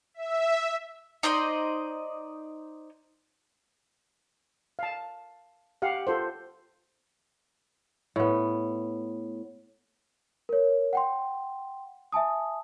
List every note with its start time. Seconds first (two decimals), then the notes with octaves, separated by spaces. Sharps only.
0.14 E5
1.23 D#4 C5 D5 D#5
4.79 F5 A5
5.82 G4 F5 F#5
6.07 F4 A4 C5
8.16 A2 B3
10.49 A#4 C#5
10.93 F#5 G5 C6
12.12 E5 G#5 A5 D#6